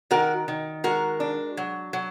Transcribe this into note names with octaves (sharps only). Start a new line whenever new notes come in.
D#3 F#4 A#4
D#3
G#3 F#4 A#4
D4
F#3
F#3